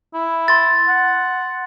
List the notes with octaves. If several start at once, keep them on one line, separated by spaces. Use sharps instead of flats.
E4
C6 A6
F#5